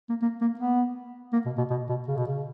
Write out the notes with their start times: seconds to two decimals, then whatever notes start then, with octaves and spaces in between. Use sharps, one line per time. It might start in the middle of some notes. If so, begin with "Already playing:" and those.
0.09 A#3
0.22 A#3
0.41 A#3
0.59 B3
1.33 A#3
1.46 B2
1.58 B2
1.70 B2
1.89 B2
2.07 C#3
2.17 B2
2.27 C#3